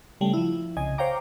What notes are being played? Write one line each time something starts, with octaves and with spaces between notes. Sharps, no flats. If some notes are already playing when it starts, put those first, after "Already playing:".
C#3 G3 A3
F3 E4
C2 C#3 D#5 G#5
C5 C#5 F5 G5 A#5 D6